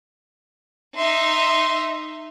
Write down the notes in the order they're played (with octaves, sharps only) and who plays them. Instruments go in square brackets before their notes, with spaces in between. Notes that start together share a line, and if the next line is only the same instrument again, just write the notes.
[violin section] D#4 E5 [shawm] C6